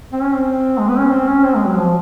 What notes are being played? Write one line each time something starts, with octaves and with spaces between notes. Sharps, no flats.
C4
C#4
C4
G#3
B3
C#4
C4
C#4
C4
G#3
F#3
F3